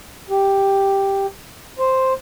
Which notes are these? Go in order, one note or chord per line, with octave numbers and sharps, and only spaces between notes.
G4
C5